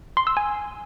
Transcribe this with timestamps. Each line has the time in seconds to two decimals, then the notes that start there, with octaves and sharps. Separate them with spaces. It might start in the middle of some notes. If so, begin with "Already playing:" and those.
0.17 C6
0.27 E6
0.37 G#5